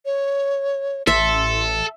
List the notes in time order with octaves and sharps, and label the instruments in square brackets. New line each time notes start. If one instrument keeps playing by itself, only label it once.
[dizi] C#5
[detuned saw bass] A1 [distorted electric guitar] A4 [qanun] E5 [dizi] C6